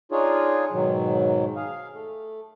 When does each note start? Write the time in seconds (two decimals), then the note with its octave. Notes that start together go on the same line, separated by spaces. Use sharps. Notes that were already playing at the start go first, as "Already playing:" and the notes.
0.12 D4 D#4 F4 G#4 C#5
0.72 G#2 B2 D#3 F#3
1.56 G#4 F5
1.93 A3